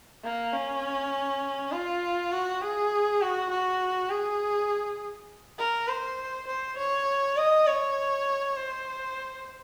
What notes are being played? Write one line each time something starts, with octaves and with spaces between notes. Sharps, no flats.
A#3
C#4
F4
F#4
G#4
F#4
F#4
G#4
A#4
C5
C5
C#5
D#5
C#5
C5